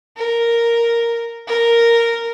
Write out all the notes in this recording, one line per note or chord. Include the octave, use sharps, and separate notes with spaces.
A#4
A#4